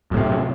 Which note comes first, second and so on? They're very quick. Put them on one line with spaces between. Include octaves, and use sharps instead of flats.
F#2 A2 C3